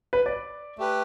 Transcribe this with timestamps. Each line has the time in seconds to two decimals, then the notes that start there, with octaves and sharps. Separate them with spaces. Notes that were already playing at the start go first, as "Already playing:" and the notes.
0.13 B4
0.26 D5
0.78 A3 G4 B4